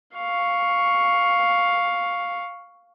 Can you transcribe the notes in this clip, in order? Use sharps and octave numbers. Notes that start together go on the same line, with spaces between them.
F5 C#6